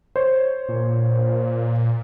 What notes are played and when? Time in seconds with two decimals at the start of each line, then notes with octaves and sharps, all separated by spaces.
0.16 C5 C#5
0.69 A#2